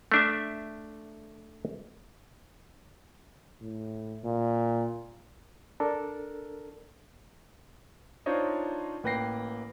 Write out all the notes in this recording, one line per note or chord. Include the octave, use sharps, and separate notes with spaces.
A3 D4 E5
A2
A#2
D4 A4 A#4
D4 D#4 F4 C5 C#5 D#5
A1 A#3 B4 G5 A#6 C7